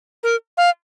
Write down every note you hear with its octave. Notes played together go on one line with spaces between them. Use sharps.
A#4
F5